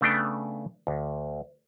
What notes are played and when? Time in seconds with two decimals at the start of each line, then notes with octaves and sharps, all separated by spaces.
0.01 C#3 A3 B3 D4 G5
0.87 D2